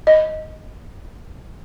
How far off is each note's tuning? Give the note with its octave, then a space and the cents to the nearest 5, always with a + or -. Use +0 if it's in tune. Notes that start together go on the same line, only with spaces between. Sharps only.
D#5 +10